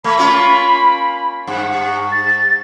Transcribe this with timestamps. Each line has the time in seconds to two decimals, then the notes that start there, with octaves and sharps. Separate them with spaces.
0.04 A3 B5
0.17 A#3 C#4 F4
1.47 G2 F#5
2.12 A6